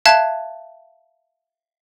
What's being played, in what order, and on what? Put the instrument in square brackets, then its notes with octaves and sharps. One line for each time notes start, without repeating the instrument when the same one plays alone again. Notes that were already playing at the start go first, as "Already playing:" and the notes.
[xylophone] E5 F5 A5 F#6 G#6